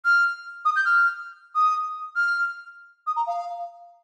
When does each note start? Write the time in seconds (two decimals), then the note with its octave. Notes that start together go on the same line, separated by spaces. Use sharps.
0.05 F6
0.65 D#6
0.76 G6
0.86 F6
1.55 D#6
2.16 F6
3.07 D#6
3.16 A#5
3.27 F5